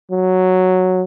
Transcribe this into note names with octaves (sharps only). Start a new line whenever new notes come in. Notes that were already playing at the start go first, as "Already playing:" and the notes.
F#3